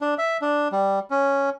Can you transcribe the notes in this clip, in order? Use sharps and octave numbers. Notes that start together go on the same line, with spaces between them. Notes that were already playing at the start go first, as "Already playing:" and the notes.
D4
E5
D4
G3
C#4